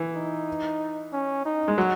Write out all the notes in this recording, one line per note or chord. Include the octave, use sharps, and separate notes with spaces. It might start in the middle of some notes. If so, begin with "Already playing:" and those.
Already playing: E3
D#4
C#4
D#4
G#3
F#3